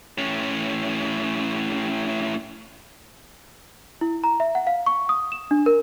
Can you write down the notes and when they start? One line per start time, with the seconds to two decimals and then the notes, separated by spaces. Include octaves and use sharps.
0.18 A2 C#4
4.01 E4
4.24 A#5
4.40 E5
4.55 F#5
4.67 F5
4.86 C#6
5.09 D#6
5.32 E7
5.51 D4
5.66 A#4